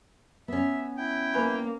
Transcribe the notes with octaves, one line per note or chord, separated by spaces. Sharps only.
B3 C#4 E5
E4 G5
A#3 B4 G#5 B5